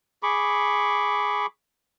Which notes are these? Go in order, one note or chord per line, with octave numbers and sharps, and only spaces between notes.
G#4 B5 C#6 D6